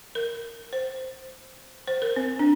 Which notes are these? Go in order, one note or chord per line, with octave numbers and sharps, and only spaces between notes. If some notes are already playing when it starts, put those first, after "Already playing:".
A#4
C5
C5
A#4
C4
D4